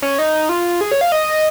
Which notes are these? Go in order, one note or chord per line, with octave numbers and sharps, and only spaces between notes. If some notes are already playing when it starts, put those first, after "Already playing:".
C#4
D#4
F4
G#4
C#5
F5
D#5